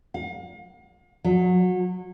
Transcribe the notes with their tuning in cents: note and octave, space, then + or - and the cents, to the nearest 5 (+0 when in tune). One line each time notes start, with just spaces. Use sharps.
F5 +40
F#3 -25